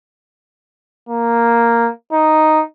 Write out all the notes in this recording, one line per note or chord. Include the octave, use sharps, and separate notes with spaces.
A#3
D#4